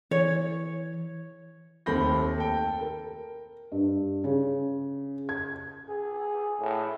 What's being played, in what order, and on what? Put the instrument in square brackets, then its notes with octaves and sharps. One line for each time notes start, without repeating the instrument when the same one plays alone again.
[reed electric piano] E3 [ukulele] C#5
[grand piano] D#2 A3 C4 B5 G6 A#6
A4 G5
[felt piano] A#4
G2
C#3
G#6
[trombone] G#4
A2